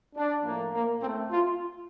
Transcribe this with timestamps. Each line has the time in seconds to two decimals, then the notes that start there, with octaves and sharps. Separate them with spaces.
0.15 D4
0.43 A2 F3 A#3
0.73 A#3
1.01 A2 C4
1.06 A3
1.31 F4